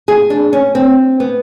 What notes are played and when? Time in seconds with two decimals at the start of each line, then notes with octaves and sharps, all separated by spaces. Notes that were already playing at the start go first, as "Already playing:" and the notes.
0.08 G#4
0.30 D4
0.53 C#4
0.75 C4
1.20 B3